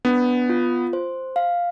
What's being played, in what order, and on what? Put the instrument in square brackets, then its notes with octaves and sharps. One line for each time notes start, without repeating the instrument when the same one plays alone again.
[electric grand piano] B3 [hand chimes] D4
[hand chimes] F4
C5
F5